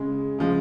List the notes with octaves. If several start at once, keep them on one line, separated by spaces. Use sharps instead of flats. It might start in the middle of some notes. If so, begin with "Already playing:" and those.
Already playing: C#3 G#3
C#3 F3 G#3